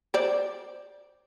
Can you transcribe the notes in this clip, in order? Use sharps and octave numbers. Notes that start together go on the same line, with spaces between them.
C5 D5